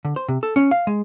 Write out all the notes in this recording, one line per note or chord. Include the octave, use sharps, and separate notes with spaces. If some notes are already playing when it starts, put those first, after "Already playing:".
D3
C5
C3
A4
C#4
F5
G#3